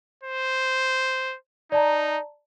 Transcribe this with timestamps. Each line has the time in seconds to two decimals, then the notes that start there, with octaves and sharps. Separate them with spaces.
0.24 C5
1.72 D#4 D5 A5 A#5